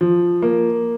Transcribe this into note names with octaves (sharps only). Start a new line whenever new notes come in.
F3
A#3